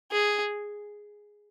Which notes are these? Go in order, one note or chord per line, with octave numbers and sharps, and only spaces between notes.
G#4